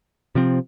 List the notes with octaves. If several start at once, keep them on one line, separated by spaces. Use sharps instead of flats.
C3 F3 C4